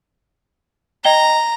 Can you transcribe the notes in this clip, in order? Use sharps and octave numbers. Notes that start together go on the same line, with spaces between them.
D#5 G5 A#5 G7